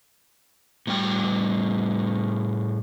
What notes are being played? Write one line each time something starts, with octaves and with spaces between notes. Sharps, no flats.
A2 G3 G5